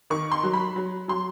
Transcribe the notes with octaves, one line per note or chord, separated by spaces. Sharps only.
D#3 C#6
C6
F#3
B5
F#3
F#3 C6